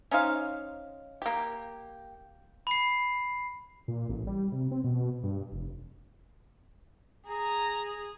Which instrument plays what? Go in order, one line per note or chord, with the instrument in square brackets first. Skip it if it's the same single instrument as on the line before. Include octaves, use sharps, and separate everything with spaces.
[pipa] C#4 D#4 C5 F5
A#3 G4
[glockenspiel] B5 C7
[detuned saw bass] A#2
A1
G3
C3
C4
B2
G2
F1
[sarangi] G#4 [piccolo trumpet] A#5